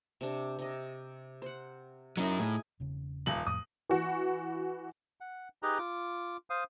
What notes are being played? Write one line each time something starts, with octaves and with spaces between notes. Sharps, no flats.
C3 D4
C3 D#5
C5 F#5
F#3 C#4 D#4 E4 D#5
A2 G#4 G#5
E1 C#3
D#1 F#7
F2 A2 D#6
E3 F#4
F#5
D#4 G4 G#4 B4 D#5 A#5
F4 D6
C5 F5 D#6